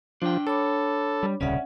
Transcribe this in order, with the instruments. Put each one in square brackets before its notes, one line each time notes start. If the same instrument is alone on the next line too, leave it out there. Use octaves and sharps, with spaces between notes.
[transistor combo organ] F3 [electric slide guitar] D4 G5
[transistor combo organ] A4 [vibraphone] C#5 B5 D6
[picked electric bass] G3
[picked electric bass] D#1 C2 C#3 [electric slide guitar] C#4 [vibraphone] D5 E5 F#5